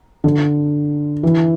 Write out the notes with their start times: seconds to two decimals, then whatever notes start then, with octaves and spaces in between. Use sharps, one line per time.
0.24 D3
1.23 E3